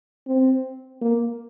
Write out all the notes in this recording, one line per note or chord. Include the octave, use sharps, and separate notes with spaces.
C4
A#3